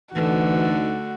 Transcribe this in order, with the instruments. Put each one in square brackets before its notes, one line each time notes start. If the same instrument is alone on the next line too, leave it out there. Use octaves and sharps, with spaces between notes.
[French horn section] D2 D#4 [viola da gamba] D3 A3 [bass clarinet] E3 [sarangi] F#4